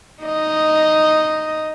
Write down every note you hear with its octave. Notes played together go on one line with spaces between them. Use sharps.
D#4 D#5